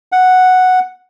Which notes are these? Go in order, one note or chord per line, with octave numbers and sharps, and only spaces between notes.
F#5